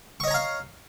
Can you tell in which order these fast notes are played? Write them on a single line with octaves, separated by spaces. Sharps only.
C#6 D#5 C#5 A#5 F5